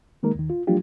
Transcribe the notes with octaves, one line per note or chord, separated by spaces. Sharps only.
D#3 G#3 A#3 D#4 A#4
D#2 D#3
F4
F3 F#3 A3 D4 F4 G4